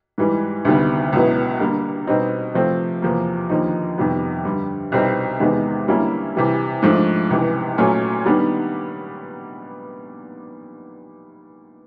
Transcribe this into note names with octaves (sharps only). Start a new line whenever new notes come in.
G#2 E3 G3
D2 C3 D#3 G3 B3
C#2 B2 F#3 B3 E4
D3 G3 A#3
B2 G3 C4 D#4
C3 F3 A3 C4
E2 C3 F3 A#3
D#2 D3 F3 A#3 D#4
F2 C3 D#3 G3 B3
G2 D3 G3
C2 B2 G3 C4 D#4
E2 C3 D#3 G#3 B3
D3 G3 A#3 C#4 E4
C3 E3 G3
G#2 F3 A3 D4
C#2 C3 E3
A#2 F#3 A3 C#4
D#3 G3 B3 D4